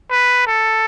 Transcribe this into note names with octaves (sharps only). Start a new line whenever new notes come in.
B4
A4